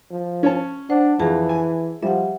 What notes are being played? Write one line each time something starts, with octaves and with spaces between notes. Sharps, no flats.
F3
C#4 C#5 A5
D4 C5 F#5
F2 E3 G#4 A5
G#5
F3 G3 E5 F#5